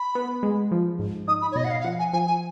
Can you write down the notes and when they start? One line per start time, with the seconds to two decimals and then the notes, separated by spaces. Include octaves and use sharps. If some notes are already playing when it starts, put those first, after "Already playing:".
Already playing: B5
0.15 B3
0.43 G#3
0.71 F3
0.99 G#2
1.28 D#4 D#6
1.42 B5
1.52 C#5
1.56 B2 D#5
1.65 F#5
1.70 F5
1.81 F5
1.84 F3 F#5
1.99 G#5
2.13 F3 G#5
2.27 G#5